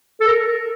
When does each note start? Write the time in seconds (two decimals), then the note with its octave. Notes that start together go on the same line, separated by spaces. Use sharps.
0.21 A4
0.27 A#4